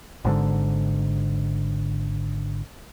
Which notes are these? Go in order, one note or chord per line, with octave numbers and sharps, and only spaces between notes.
G#1 G#2 D3